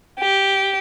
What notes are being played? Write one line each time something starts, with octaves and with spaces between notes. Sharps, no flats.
G4